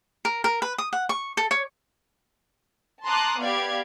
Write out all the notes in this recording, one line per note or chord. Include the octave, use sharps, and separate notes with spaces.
A#4
A#4
B4
D#6
F#5
C#6
A4
C#5
A5 A#5 C6 D6 D#6 F#6
B3 G4 D5 F5 G#6 D7